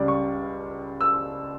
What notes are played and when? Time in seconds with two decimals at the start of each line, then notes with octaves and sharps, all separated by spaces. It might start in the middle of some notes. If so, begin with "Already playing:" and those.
Already playing: C#2 C#3 G3 D5
0.08 C#6
1.01 E6